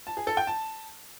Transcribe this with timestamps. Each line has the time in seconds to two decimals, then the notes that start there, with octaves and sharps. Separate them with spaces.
0.07 A5
0.17 G#4
0.27 A4
0.37 G5
0.47 A5